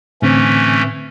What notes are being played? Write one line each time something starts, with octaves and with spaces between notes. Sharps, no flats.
A2 D3 E3 A3 C4 C#4